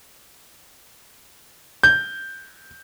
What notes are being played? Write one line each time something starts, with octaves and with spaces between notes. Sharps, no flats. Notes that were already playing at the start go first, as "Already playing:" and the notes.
G6